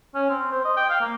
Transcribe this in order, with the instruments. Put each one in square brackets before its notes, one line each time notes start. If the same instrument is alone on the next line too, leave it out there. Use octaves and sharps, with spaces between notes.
[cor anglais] C#4
C4
C5
D#5
G5
F5
A#3